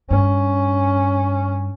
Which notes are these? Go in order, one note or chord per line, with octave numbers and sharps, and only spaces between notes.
G2 C#4